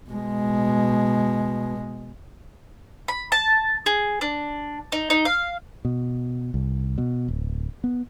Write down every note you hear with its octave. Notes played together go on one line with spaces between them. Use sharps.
B2 G#3
B5
A5
G#4
D4
D#4
D#4
F5
B2
C2
B2
D1
B3